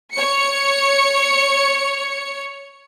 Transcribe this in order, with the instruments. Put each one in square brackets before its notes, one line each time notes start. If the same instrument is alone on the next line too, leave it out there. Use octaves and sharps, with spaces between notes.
[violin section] C#5 C#7